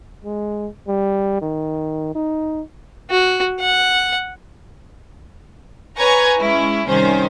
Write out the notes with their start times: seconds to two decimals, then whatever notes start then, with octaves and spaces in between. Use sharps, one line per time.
0.24 G#3
0.88 G3
1.42 D#3
2.15 D#4
3.11 F#4
3.61 F#5
5.97 B4 C#5 G#5 A#5 C#6 G#6
6.39 G#3 C#4 E4
6.88 C2 D#3 C#4 C5